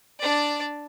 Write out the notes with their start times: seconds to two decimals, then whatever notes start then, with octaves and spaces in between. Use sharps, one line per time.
0.20 D4 D5